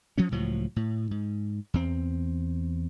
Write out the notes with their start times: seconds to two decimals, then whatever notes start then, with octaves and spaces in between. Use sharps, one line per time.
0.18 F3 F#3 C#4
0.31 C#2 A2 F3 F#3
0.76 A2
1.11 G#2
1.74 E2 C4